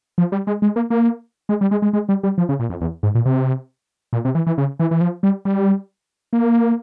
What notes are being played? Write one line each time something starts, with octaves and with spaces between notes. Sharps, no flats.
F3
G3
G#3
G#3
A#3
A#3
G#3
G3
G#3
G#3
G#3
G3
G3
F3
C#3
A#2
F2
E2
G#2
A#2
C3
A#2
C3
E3
E3
C#3
E3
E3
F3
G3
G3
A#3